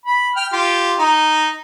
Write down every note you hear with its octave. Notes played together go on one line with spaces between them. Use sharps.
B5
G5 F6
F4 G4
D#4